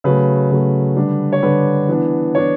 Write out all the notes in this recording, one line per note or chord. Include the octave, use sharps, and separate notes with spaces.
C#3 F#3 A3 B4
C#3 F#3 A3
D3 G3 D4
C#5
D3 G3 D4 B4
E3 B3 D4
E3 B3 D4 C#5